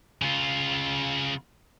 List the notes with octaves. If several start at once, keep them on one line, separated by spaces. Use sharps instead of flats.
C#3 F4